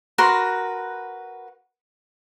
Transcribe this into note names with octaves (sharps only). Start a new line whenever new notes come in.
F#4 A#4 B4 C6